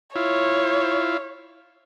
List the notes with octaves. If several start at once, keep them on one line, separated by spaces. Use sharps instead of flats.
E4 F4 C#5